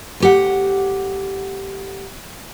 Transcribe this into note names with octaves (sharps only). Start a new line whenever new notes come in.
D2 G4 F#5